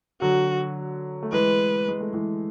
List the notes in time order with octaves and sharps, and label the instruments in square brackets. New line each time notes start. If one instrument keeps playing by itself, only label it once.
[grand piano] D3 F#3 [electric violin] F#4
[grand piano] A3
[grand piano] E3 G#3 [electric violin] B4
[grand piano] G#3
A3
E3 G#3